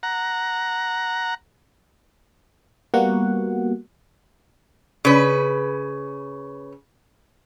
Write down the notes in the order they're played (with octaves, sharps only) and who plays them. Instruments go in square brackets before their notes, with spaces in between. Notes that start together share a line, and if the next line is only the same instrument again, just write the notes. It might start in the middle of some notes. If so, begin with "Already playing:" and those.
[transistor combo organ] F#5 A#5
[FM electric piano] G3 A#3 B3 F#4 F#5
[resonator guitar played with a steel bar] C#3 B4